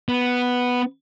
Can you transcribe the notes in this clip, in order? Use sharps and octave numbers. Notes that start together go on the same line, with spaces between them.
B3